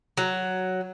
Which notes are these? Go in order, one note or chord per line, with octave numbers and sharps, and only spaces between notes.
F#3